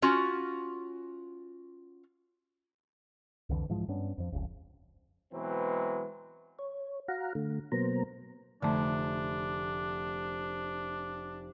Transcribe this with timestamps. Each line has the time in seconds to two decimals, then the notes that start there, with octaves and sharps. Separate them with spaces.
0.02 C#4 F4 F#4
3.49 C2 F2 D3 E3
3.69 G#2 E3 F3 G#3
3.88 G2 B3 C#4 D4
4.18 F2 F3
4.32 F1 C#2
5.33 B2 E3 F#3 G#3 C4
6.59 C#5
7.08 F#4 F5 F#5 A#5
7.35 D3 A3
7.72 B2 F#3 A#3 B3 C5 A#5
8.62 F1 D3 A3 D4